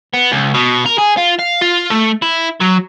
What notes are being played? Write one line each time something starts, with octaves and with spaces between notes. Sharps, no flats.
B3
C#2
B2
A#4
G#4
F4
F5
F4
A3
E4
F#3